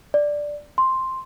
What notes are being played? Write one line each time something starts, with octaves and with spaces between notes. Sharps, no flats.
D5
C6